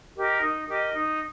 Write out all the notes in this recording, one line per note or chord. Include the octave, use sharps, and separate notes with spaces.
G4 A#4 D#5
D#4
G4 A#4 D#5
D#4